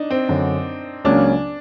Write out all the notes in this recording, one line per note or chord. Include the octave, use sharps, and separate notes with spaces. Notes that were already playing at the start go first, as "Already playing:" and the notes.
Already playing: D4 D#4
C4
F#2 D3 F#3
C#2 C#3 F#3 A#3 C#4 D4